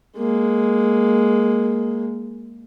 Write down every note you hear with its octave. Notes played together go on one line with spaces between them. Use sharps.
G#3 A#3